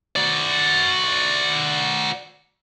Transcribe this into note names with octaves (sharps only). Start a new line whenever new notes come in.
F#4 D5